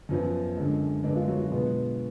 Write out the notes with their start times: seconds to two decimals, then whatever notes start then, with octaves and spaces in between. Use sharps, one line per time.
0.09 F#2 F3 B3
0.57 F#2 D3 G#3
1.04 F#2 D3 G#3 B3 D4
1.15 F4
1.28 F#3 F#4
1.39 F4
1.51 B2 G#3 B3